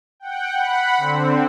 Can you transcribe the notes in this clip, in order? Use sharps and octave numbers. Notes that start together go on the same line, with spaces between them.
F#5 G5
F#5 B5
D3 C4